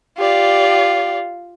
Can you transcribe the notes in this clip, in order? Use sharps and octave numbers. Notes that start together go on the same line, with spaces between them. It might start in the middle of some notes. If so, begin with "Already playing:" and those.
F4 G4 D5